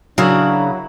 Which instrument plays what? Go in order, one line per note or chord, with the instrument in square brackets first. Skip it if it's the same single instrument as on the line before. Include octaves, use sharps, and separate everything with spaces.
[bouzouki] C#3 [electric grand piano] F#3 [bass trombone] D4 [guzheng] E4 F#4 A#4